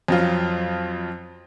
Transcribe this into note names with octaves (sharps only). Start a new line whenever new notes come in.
F2 F#3 F4